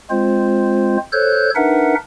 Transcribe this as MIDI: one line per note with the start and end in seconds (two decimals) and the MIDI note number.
0.10 0.97 56
0.10 0.97 60
0.10 0.97 65
0.10 0.97 72
1.12 1.50 69
1.12 1.50 72
1.12 1.50 73
1.12 1.50 90
1.12 1.50 91
1.55 1.95 62
1.55 1.95 63
1.55 1.95 70
1.55 1.95 71
1.55 1.95 76
1.55 1.95 78